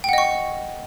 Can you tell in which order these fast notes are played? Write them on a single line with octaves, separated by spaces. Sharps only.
G5 F#5 D#5 C#6